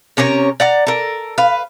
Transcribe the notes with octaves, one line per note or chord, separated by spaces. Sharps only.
C3 C#4 A#4 C#5
D5 F#5 A#5
A4 A#4
B4 F5